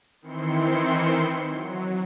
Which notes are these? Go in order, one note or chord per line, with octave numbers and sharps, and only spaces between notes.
D#3 E3 C4 E4 C6 C#7
F#3